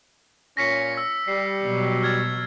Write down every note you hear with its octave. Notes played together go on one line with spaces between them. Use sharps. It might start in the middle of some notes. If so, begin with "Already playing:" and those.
A#2 C#4 A#6 B6 C#7
E6 A#6
G3 C7
B2 F#3
F6 G#6 A6